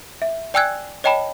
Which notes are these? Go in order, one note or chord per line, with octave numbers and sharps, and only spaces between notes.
E5
D5 G5 G#5 E6 F#6 G#6
C#5 D#5 G5 A5 B5